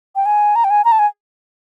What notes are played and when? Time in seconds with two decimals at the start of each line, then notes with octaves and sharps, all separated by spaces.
0.16 G5
0.26 G#5
0.56 A#5
0.64 G5
0.70 G#5
0.85 A#5
0.92 A5
0.99 G#5